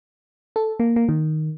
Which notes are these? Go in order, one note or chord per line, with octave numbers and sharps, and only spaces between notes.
A4
A#3
A#3
D#3